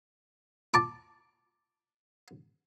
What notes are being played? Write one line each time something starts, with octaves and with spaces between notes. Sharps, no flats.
A5 D6